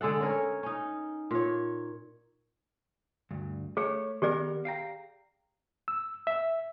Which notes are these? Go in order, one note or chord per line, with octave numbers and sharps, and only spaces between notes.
D3 G#3 A4 F#5
C#4 A#4 C#5
C#4 D#4
A#2 C#5
D2 G2
A3 G#4 C#5
D#3 B3 G4 G#4 A#4 D5
F5 G5 A#5
E6
E5